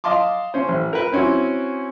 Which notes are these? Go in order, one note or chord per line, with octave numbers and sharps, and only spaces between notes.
D#5 F5 A5 C6 D6
C#4 C5
A1
A#4 B4
C4 C#4 E4 F#4